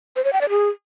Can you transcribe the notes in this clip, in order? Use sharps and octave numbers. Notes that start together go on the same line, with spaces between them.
C5
C#5
G5
D5
G#4